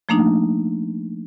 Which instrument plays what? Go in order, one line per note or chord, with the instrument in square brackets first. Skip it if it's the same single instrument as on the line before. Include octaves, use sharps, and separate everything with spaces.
[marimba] F3 A3 A#3 D4 D#4